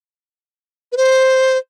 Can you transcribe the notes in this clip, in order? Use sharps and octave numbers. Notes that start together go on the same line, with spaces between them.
B4
C5